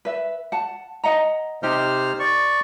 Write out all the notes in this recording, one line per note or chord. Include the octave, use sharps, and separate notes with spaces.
B4 E5
F#5 A5
D#5 F#5 A#5
C3 D#4 G4 C5 F6
D5 C#6